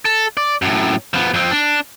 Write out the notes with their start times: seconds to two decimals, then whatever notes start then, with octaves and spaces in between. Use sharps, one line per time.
0.05 A4
0.37 D5
0.62 F#2 A2
1.14 F3 B3
1.34 F2 C4
1.51 D4